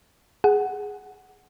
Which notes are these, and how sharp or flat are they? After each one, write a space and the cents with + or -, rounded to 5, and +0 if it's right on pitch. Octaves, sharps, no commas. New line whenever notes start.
G#4 +0 F#5 +5